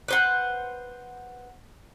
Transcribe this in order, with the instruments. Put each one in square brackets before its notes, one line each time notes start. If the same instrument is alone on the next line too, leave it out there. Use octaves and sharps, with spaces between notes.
[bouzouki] B4 C5 F#5